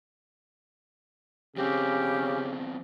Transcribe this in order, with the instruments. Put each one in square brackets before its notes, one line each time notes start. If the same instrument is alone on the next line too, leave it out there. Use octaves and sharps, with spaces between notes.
[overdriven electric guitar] E2 C4 [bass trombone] C#3 [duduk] C#4 [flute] G4